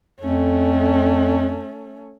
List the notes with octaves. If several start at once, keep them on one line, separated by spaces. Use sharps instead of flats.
F2 A3 C#4